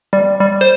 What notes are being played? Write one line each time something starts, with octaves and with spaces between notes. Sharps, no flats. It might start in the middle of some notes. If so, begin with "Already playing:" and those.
G3
G3
C5